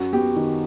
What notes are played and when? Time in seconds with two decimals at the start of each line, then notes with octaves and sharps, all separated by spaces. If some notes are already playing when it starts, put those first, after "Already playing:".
Already playing: F#2 F#4
0.13 B3 G4
0.36 D#3